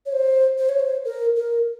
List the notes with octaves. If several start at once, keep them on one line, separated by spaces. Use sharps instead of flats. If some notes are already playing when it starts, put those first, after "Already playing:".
C#5
C5
C5
C#5
C5
A#4
A#4